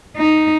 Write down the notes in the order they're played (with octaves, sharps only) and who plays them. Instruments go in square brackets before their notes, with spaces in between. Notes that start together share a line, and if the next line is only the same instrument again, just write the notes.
[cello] D#4